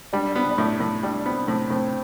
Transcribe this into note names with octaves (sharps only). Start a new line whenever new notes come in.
G3 D4
B3
D4
A2 E4
A2
G3 D4
B3 C4
A2 C4
A2 C4